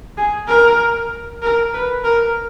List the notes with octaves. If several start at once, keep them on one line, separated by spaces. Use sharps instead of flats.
G#4
A#4
A#4
B4
A#4